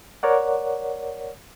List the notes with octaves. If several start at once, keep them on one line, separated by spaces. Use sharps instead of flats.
A#4 C#5 D5 F#5